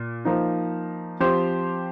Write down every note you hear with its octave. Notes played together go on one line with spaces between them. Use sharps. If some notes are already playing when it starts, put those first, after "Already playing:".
Already playing: A#2
F3 A#3 D#4
F3 C4 G4 C5